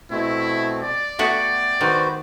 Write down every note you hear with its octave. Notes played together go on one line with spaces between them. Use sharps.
B2 A3 C4 E4
D5
A3 B3 F#4 G5
D#3 F#4 B4 C5